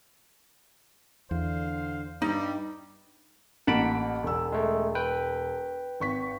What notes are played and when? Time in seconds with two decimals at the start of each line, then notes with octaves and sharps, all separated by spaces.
1.31 E2 D3 C5 F5
2.22 G2 G3 D#4
3.67 A1 A#3 F#5 A5 B5 D7
4.23 E1 E6
4.52 G#3 A3
4.95 B4 G5
6.00 G#1 C#6 B6